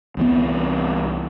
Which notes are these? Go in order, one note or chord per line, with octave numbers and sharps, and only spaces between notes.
C2 E3 B3